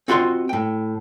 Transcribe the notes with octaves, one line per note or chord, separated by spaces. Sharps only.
C4 F4 F#4 D#5 A#5 C6
A2 G5